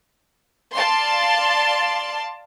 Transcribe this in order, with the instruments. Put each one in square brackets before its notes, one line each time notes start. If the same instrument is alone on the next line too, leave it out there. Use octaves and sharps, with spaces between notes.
[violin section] D5 F5 A5 C6